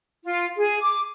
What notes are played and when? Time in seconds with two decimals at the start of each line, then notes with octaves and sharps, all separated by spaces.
0.25 F4
0.57 G#4
0.80 D6